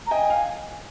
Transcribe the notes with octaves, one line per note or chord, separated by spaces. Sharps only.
A#5
D#5 G5 G#5
F5